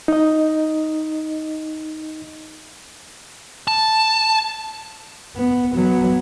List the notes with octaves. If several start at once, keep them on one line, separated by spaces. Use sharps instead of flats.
D#4 D#5
A5
B3
F#3 B3